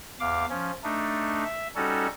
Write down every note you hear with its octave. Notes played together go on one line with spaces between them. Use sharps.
E2 F5 D6
F3 C#4
A3 D4 D#4
E5
G3 C#4 D#4 F#4 A4